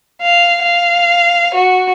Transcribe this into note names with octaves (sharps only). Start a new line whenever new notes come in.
F5
F5
F#4